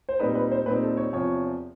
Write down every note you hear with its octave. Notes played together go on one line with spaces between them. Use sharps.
C5
A#2 G3 C4 D#4 B4
B4
C5
A#2 G3 C4 D#4 B4
A4
C#5
E2 C3 F3 C#5